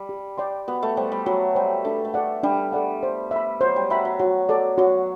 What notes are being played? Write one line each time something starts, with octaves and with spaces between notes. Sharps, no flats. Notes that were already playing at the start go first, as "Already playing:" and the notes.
Already playing: G3
G4
D5 G5 C6
B3 F#4
A3
G3 C5 G5
G3
F#3 F#4
G3 C5 G5
A3 D4
A3
A4 D5 F#5
G3 D4
A4 D5 F#5
C5
E5 B5
F#3 C5
G3
F#3 E5 B5
F#3
F#3 F#4
A4 D5
F#3 F#4